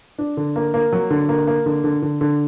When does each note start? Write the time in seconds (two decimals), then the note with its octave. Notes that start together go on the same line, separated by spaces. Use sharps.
0.18 D4
0.37 D3
0.56 A#3
0.74 A#3
0.92 F#3
1.10 D3
1.29 A#3
1.47 A#3
1.66 D3
1.84 D3
2.02 D3
2.21 D3